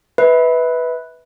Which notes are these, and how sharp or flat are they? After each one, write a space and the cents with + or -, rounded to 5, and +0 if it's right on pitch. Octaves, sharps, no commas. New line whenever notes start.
B4 +0 E5 -30